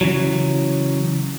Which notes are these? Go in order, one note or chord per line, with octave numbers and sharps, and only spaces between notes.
C#3 E3 F#3